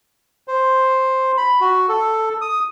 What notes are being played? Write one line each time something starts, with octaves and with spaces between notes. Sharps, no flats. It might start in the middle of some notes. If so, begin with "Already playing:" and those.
C5
B5
F#4
A4
D#6